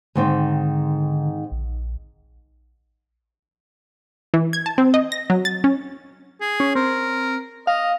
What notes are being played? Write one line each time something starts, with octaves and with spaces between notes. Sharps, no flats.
G#2 D3 D#3 C4
A#1
E3
G#6
A5
C4
D#5
A#6
F#3
A6
C#4
G#4
C#4
C4 A#4
D#5 F5